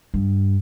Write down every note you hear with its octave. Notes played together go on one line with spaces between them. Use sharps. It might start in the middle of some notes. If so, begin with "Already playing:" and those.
G2